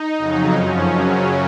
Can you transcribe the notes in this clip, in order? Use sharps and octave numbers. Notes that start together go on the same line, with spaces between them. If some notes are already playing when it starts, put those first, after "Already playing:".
Already playing: D#4
F2 C#3 F#3
F#2 F3 C#4
F#2 C#3 F#3